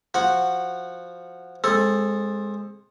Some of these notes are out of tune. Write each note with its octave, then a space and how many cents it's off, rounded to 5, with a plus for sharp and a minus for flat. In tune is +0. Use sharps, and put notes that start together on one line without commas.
F3 +0 F#4 +0 F#5 +0
G#3 -15 C4 +15 A4 +0